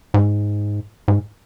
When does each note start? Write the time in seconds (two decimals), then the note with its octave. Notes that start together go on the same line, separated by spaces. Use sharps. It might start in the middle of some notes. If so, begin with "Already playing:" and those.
0.14 G#2
1.08 G#2